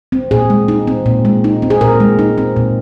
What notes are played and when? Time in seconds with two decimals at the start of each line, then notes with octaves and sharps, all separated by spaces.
0.12 C4
0.31 A#2 G#4
0.50 G#3
0.68 D#4
0.87 C4
1.06 A#2
1.25 G#3
1.44 D#4
1.62 C4
1.70 G#4
1.81 A#2 A#4
2.00 G#3
2.19 D#4
2.38 C4
2.56 A#2